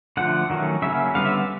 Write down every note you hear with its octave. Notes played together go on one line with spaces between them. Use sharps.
D3 F3 A3 F#5
D#3 F#3 A3 C#4
C#3 F#3 A#3 C#4 E5
D3 G3 B3 F5
E5